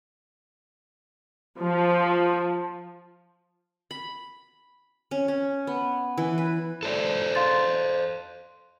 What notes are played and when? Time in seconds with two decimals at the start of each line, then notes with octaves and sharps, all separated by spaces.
1.59 F3
3.91 B5
5.11 C#4
5.28 C#4
5.67 B3
6.18 E3
6.38 B4
6.83 A4 C5 D5
7.35 F5 C6 A6